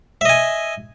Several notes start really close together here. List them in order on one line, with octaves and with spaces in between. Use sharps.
E5 D#5 G#5